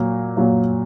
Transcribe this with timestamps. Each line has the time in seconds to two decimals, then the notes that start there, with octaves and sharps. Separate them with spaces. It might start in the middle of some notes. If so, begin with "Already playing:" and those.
Already playing: A#2 F#3 A#3
0.37 A#2 F#3 A#3